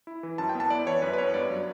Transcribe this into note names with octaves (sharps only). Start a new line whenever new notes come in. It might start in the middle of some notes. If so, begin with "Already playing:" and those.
E4
E3
F#2 A5
G5
B3
A5
E4 D5
E3 C#5
F#2 B4
B4
B3 C#5
G2 D5
F#3